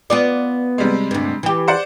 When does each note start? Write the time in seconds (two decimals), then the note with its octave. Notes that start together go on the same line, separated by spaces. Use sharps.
0.10 B3 F4 D5
0.78 C3 G3 G#3
1.11 D2 G2
1.43 E3 G4
1.68 C5 D5 F#5